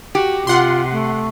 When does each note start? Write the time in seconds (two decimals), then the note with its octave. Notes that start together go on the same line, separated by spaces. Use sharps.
0.15 F#4 G4
0.47 C3 F4 F#5 C6
0.91 A3